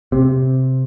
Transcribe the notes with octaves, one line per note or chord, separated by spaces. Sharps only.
C3